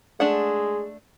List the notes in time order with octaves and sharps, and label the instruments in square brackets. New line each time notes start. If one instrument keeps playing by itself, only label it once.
[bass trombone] G#3 [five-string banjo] A3 D4 F#5